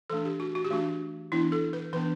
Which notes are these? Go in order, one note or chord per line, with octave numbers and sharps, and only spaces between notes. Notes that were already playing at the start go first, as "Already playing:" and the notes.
E3 A3 D4 A4
G4
F#4
F#4
G4
E3 A3 D4 F#4
E3 B3 D4 E4
A4
B4
E3 B3 D4 B4